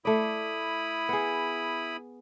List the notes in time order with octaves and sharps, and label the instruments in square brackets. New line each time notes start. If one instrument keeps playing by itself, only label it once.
[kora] A3 D5 [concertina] E4 B5 D#6
[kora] B3 G#4